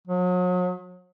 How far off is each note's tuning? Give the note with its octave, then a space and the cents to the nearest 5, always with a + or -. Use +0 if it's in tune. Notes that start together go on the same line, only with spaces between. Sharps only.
F#3 -40